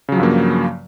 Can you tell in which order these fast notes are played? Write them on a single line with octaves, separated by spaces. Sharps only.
C#3 F#3 F3 G2 A#3